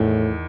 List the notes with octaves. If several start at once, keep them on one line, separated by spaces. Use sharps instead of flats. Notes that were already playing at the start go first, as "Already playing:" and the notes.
Already playing: E2 A2 D#3